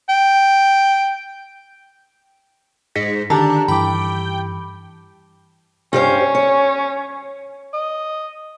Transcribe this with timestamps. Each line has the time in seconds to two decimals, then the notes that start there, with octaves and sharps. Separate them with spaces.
0.09 G5
2.95 G#2 A#6 B6 C#7
3.30 D3 D#3 D4 G4 A4 A#5
3.68 G2 E3 G5 B5 D6
5.93 G2 C#4 G4 C5
6.35 C#5
7.74 D#5